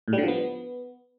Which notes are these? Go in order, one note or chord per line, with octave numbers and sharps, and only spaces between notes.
A2
G3
D3
F3
B3